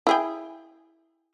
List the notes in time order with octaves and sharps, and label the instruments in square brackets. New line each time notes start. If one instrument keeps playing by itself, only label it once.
[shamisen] E4 G#4 G5